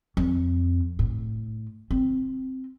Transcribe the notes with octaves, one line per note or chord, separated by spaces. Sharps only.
F2
A2
C4